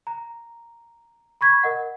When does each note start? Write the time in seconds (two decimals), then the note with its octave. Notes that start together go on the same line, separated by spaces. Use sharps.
0.07 A#5
1.41 B5 C#6 G#6 B6
1.63 A#4 D#5 F#5